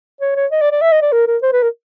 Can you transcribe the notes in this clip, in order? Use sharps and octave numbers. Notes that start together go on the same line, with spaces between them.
C#5
C#5
D#5
D5
D5
E5
D#5
D5
A#4
A#4
C5
B4
A#4